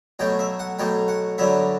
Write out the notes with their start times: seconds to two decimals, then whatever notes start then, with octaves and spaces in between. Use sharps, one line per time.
0.19 B2 F#3 A3 G5
0.39 E5
0.59 F#5
0.79 B2 F#3 A3 G5
1.08 F#5
1.38 G2 D3 F#3 B3 E5